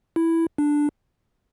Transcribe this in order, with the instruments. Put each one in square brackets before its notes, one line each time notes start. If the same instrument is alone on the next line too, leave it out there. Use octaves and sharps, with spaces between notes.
[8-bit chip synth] E4
D4